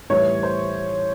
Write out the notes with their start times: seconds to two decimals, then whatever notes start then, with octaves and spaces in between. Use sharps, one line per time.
0.10 A2 E3 G3 C#5
0.43 C5